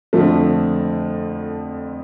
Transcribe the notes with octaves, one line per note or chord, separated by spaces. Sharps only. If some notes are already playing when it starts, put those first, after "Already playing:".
F2 D3 F3 A3